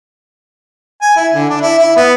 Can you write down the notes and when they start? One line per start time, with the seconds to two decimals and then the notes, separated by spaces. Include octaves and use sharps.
1.01 G#5
1.16 E4
1.34 D3
1.49 D4
1.61 E4
1.78 E4
1.96 B3